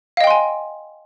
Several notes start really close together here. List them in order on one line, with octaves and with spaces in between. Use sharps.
F5 D#5 G5 C6 G#5